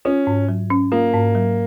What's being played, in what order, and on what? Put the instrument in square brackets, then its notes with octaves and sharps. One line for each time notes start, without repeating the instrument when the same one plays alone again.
[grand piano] C#4 [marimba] F4
[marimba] G#2
F#3
C#4
[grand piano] A#3 [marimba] F4
[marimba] G#2
F#3